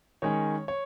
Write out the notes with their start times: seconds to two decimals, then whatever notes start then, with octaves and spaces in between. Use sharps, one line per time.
0.22 D#3 G#3 C#4 C#5
0.68 C#5